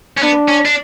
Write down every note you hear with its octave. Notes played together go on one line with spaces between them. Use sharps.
C#4
B3 D4
C#4
D4